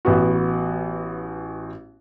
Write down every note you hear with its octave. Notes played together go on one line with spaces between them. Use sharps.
A1 B3 F#4